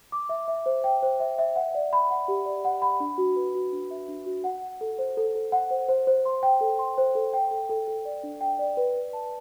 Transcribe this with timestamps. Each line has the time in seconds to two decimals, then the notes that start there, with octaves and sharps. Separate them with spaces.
0.12 D6
0.29 E5
0.48 E5
0.66 C5
0.84 G5
1.02 C5
1.20 E5
1.38 E5
1.56 F#5
1.75 D5
1.93 B5
2.10 F#5
2.28 G4
2.46 D5
2.65 F#5
2.82 B5
3.00 D4
3.18 F#4
3.36 B4
3.55 F#4
3.73 D4
3.91 E5
4.09 D4
4.26 F#4
4.44 F#5
4.62 F#5
4.81 A4
4.98 C5
5.17 A4
5.35 A4
5.52 F#5
5.71 C5
5.88 C5
6.07 C5
6.25 C6
6.43 G5
6.61 A4
6.79 C6
6.98 C5
7.15 A4
7.33 G5
7.51 A4
7.70 A4
7.88 A4
8.05 D5
8.23 D4
8.41 G5
8.59 D5
8.77 B4
8.95 B4
9.13 A5